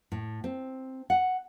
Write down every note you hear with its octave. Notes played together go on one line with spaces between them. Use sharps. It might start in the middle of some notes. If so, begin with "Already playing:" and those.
A2
C4
F#5